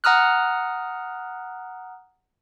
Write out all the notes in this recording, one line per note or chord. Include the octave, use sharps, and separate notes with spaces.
F#5 A#5 D#6 F6 F#6